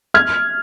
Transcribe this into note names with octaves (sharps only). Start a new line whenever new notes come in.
F6 G#6